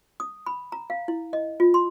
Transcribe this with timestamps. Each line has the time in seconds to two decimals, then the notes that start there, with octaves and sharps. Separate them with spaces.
0.20 D#6
0.46 B5
0.72 A#5
0.90 F5
1.08 E4
1.33 D#5
1.60 F4
1.74 C6